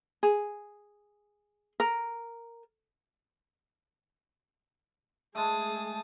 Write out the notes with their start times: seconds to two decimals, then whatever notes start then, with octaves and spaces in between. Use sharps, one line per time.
0.23 G#4
1.80 A#4
5.35 G#3 A3 G#4 A5 D#6